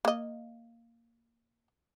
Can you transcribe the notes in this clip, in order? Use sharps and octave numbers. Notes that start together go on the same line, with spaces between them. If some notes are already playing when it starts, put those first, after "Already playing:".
A#3 D#5